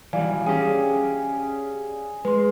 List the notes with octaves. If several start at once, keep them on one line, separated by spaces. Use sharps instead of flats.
E3 F#3 G3 D5 F5 G#5
C#4 G4 G#4 D6
G#3 B4 C6